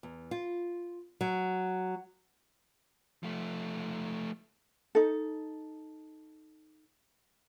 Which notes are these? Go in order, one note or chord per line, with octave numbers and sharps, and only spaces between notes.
E2
F4
F#3
F3 A3
D#4 A4